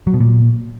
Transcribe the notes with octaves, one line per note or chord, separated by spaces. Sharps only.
F#3
B2
A#2